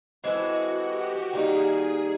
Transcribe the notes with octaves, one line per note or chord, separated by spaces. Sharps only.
E3 G#3 C4 E4 F#4 A4
G4
D#3 G3 A#3 D#4 G#4